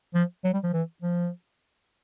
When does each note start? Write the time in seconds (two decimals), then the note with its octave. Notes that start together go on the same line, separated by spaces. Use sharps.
0.14 F3
0.44 F#3
0.53 G3
0.64 F3
0.73 E3
1.02 F3